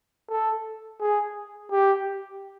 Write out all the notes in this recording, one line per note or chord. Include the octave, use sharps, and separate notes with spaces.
A4
G#4
G4